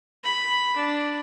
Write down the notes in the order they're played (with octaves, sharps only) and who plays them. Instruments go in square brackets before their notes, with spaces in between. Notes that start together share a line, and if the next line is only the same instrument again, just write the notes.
[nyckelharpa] B5
D4